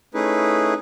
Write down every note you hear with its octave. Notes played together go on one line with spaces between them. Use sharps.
A3 C#4 D#4 E4 G#4 B4